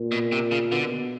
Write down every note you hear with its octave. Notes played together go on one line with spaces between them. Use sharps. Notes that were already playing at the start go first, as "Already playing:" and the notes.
Already playing: A#2
B2
C3
C#3
B2 D3